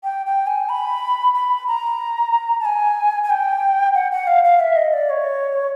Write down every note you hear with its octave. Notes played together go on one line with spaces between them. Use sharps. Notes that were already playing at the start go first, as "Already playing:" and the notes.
G5
G5
G#5
B5
B5
A#5
A5
G#5
G#5
G5
F#5
F#5
F5
F5
E5
D#5
D5
C#5